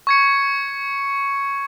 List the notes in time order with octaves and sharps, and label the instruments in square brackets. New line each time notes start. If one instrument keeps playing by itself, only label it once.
[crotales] C#6 G#6 C#7